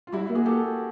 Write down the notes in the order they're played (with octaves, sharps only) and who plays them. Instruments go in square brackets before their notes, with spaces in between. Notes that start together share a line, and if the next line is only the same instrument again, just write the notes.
[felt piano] F4
[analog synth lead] G3 [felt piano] E4 F#4
[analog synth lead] A#3
[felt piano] F#4 G#4
G4 A4